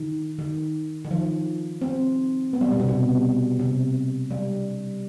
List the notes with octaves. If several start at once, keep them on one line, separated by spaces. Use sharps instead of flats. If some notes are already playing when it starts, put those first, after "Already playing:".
Already playing: D#3
D#3
D#3
F3
C4
B3
G3
B2
C3
B2
C3
G3